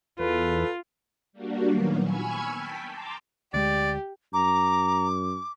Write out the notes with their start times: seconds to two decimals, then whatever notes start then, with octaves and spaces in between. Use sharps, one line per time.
0.20 E2 F4 A4 B4
1.33 G3 A#3 D4 F#4
1.70 A#2 D#3 F#3 A#3 B3
2.01 G#5 B5 C#6 E6 F6 G#6
2.53 G5 A5 B6
2.89 A5 A#5 C6 D6
3.54 D2 G#3 G4 D5
4.33 F#2 A#5 D6